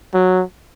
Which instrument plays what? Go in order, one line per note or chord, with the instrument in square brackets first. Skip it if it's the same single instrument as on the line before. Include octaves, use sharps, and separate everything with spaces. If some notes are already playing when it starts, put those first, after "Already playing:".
[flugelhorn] F#3